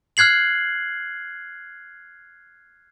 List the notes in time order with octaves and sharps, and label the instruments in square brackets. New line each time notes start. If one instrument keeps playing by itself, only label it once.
[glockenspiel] F6 F#6 G#6 C7 F#7